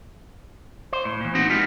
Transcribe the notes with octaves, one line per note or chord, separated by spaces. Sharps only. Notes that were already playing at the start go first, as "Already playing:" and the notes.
C5
A2
A#2 E3
B3 C4 D#4 F#4
E3 G#3 B3 D#4 F4 G4